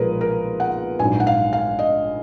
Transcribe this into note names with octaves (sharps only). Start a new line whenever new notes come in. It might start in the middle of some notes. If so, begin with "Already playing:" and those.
Already playing: B1 A#2 F3 G#3 F4 G#4 A#4 B4
A#4
F#5
A#1 G#2 F#3 G#5
F#5
F5
F5
D#5